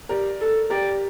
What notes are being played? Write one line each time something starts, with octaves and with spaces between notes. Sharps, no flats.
G4 A#4 D5
A4
G4 A#4 D5